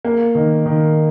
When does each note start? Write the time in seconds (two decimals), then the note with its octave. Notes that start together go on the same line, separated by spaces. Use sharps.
0.05 A#3
0.35 D#3
0.66 D#3